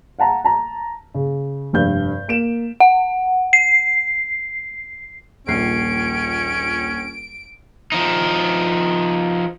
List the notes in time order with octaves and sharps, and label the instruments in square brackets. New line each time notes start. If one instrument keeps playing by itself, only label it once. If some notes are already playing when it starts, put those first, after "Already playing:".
[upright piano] F5 F#5 A5 A#5
A5 A#5
C#3
F1 G2 G6
A#3 D7 E7
[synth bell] F#5
C7
[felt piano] D#1 A#1 C7 [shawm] C#4 [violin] D7
[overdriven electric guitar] F3 D#4